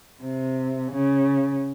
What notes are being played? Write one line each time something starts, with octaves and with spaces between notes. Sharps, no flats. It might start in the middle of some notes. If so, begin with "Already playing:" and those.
C3
C#3